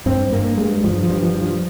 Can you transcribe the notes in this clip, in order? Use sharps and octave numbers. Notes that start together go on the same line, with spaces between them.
G2 C4
G2 A#3
G2 G#3
G2 F3
F3
G2
F3
G2
F3